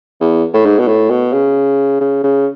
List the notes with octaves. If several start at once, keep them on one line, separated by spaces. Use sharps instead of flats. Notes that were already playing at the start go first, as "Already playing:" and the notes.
E2
A2
G#2
B2
A2
B2
C#3
C#3
C#3